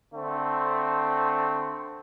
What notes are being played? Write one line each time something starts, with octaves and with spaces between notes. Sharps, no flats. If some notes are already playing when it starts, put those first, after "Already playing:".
D3 A3 C4